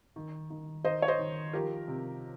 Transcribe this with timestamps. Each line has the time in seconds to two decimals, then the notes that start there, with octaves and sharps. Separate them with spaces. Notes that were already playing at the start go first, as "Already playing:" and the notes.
0.16 D#3
0.50 D#3
0.84 D#3 C5 D#5
1.02 C#5
1.08 C5 D#5
1.19 D#3
1.53 F3 G4 A#4
1.88 C3